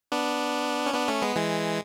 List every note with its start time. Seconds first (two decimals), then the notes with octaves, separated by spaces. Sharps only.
0.12 B3 D4
0.86 C#4
0.94 B3 D4
1.08 A3 C#4
1.22 G#3 B3
1.36 E3 G#3